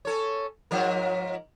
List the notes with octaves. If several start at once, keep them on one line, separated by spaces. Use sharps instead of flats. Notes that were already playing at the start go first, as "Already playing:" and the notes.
C#4 A4 C#5
G#2 F3 A#4